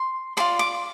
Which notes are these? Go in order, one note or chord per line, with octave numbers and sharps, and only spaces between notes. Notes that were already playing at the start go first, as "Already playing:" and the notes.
Already playing: C6
F4 G#4 D5 C6
D6